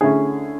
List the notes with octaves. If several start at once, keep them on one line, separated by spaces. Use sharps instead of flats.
D3 A3 C#4 E4 G#4